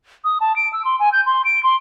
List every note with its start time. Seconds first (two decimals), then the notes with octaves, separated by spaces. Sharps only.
0.24 D#6
0.40 A5
0.56 D7
0.73 E6
0.85 C6
0.99 G#5
1.12 G6
1.26 C6
1.45 D7
1.63 C6